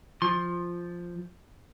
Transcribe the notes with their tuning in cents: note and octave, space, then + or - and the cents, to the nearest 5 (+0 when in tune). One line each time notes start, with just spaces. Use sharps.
F3 +0 C6 +20